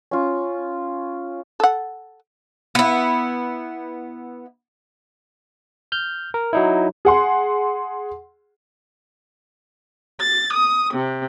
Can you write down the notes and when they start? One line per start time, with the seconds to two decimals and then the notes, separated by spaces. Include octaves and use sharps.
0.11 C#4 F4
1.60 A4 F#5
2.75 B3 E4
5.92 F6 G6
6.34 A#4
6.53 F#3 D#4 E4
7.05 G#4 F#5 C6
10.21 A6
10.54 D#6
10.94 C3